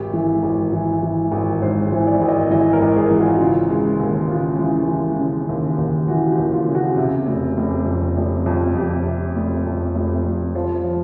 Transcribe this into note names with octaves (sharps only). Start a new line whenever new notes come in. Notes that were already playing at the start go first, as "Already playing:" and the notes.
Already playing: G#1 G4
E3
G#1
E3
E3
G#1
G#2 C5
C5
E3
D5
G#1
D#5
E3 D#5
A#4
G#1
G#4
E3
F#4
F4
C#3 F4
G#3
D#2
C#3 F4
E3
E3
C#3
D#2
D#2
E3 F#4
G4
D#2
F4
C#3
F#4
C3
F1
F1
F2
F1
F2
F2 G4
C3
F1
F2
F1
F1
F3
F3